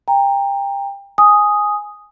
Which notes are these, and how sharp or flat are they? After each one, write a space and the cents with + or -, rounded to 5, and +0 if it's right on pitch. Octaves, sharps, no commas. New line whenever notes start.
G5 +25 A#5 +0
G#5 +0 D#6 +0